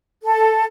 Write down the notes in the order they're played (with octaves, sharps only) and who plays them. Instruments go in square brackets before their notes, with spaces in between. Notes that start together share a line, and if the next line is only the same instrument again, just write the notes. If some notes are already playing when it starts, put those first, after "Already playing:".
[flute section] A4